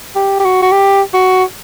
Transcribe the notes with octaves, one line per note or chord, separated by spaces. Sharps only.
G4
G4
F#4
F#4
G4
F#4